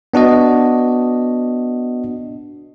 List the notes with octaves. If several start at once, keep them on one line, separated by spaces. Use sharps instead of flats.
B3 D4 F#4 D#5